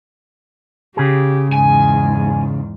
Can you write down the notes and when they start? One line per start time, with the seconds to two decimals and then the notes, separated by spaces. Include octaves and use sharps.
0.97 C#3 G4 G#4
1.52 E2 G#2 G#5